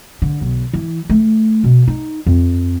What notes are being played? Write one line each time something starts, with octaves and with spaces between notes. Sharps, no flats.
D3
B1
E3
A3
B2
D#4
F2